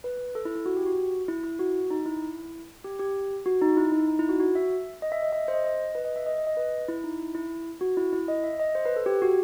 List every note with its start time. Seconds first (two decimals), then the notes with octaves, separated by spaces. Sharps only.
0.04 B4
0.35 A4
0.45 E4
0.55 E4
0.66 F#4
0.76 G4
0.86 F#4
1.28 E4
1.44 E4
1.59 F#4
1.90 D#4
2.06 E4
2.84 G4
3.00 G4
3.46 F#4
3.61 D#4
3.77 E4
3.92 D#4
4.08 D#4
4.19 E4
4.29 F#4
4.40 F#4
4.55 E5
5.02 D#5
5.12 E5
5.22 D#5
5.33 E5
5.48 C5
5.54 D#5
5.64 D#5
5.95 B4
6.05 D#5
6.16 E5
6.26 D#5
6.37 D#5
6.47 D#5
6.57 B4
6.89 E4
7.04 D#4
7.20 E4
7.35 E4
7.81 F#4
7.97 E4
8.13 E4
8.28 D#5
8.44 E5
8.60 D#5
8.75 C5
8.86 B4
8.96 A4
9.06 G4
9.22 F#4